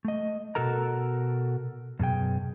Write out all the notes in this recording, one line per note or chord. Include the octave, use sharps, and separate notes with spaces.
A3 D#5
B2 F#4 A4 A#4 A#5
F#2 B2 G#4 G5